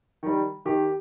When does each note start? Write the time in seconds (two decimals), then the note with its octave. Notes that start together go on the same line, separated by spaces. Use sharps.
0.23 D#3 G3
0.65 D#3 G4